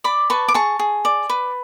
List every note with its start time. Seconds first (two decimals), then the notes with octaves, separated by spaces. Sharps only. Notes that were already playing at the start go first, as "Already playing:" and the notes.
0.04 D5 B5 D6
0.30 B4 A5 C#6
0.48 D6
0.54 G#4 A5 C#6
0.79 G#4
1.05 D5
1.30 B4